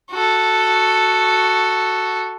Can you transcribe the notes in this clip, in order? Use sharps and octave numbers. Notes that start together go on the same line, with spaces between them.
F#4 A4